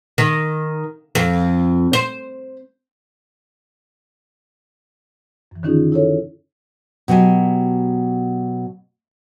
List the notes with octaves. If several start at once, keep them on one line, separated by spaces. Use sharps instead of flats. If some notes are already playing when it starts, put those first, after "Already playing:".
D#3
F2
C5
F#2 E3
D3 D#3 C#4 D#4 F4 G#4
E4 A4 C#5
B2 F#3 G4 G#5